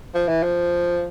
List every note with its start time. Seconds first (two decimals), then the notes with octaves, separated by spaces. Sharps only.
0.15 F3
0.28 E3
0.43 F3